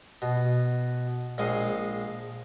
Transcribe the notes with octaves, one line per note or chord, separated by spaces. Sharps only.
B2
A#1 G#3 F5 C#6 D#6